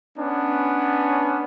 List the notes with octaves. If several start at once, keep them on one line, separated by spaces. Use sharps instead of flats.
B3 C#4 D4